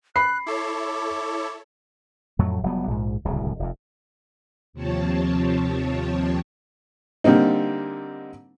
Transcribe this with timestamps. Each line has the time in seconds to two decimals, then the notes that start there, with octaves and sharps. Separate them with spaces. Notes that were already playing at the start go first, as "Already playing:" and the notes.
0.16 B5 F#6 C7
0.46 E4 A4 C#5 D6
2.39 F2 A2 F#3 A3
2.63 F1 F#3 G3 B3
2.87 A#1 G#2
3.25 D1 C2 A2 C#3
3.59 F1 F2
4.73 D#2 C3 F3 C4 C#5 A5
7.24 D3 G3 A#3 C4 D#4